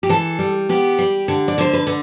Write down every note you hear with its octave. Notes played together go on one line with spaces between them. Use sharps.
G4
E3 A4
G3
B3 G4
G3
D3
D5
D3 C5
B4
D3